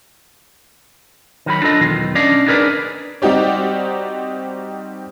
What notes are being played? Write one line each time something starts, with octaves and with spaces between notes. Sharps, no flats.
D#3 F#3 B5
D4 F4 A4 D#5
B1 E2 D#3 F4
C#4 D4 D5 D#5 F5
D4 D#4 G#4 A#4 B4 D5
G3 C4 D#4 F#4 G4 D5